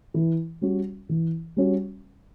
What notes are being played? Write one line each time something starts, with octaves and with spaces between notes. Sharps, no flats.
E3
G3 C#4 F#4
E3
G3 C#4 F#4